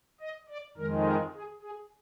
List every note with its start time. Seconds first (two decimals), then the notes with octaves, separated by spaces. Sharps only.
0.21 D#5
0.49 D5
0.77 F2 D#3 G#3 A#4
1.05 A#4
1.34 G#4
1.62 G#4